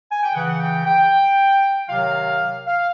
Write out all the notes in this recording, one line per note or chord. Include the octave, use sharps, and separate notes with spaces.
G#5
G5
C#3 E3 F#5
G5
G5
C3 D#3 F#3 F5
F5